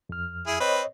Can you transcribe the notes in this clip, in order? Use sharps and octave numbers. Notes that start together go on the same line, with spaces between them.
F2 F6
E4 G#4
C4 B4 C#5 D#5